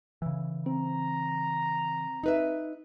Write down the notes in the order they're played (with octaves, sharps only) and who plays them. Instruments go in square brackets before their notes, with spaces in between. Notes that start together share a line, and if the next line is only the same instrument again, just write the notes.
[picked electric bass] C#3 E3
[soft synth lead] C4 [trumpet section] A#5
[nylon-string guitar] D#4 B4 E5